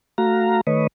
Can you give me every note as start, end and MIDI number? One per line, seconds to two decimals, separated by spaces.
0.18 0.61 57
0.18 0.61 66
0.18 0.61 77
0.18 0.61 82
0.67 0.87 51
0.67 0.87 57
0.67 0.87 71
0.67 0.87 73
0.67 0.87 75